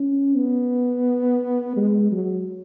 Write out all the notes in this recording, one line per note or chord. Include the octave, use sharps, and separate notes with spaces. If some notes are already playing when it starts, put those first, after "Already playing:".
Already playing: C#4
B3
G#3
F#3